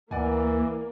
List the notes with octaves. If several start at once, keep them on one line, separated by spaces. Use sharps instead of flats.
D2 E3 A#3 D5 F#5 G#5